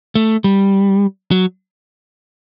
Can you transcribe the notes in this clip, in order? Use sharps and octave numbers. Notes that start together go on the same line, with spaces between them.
A3
G3
F#3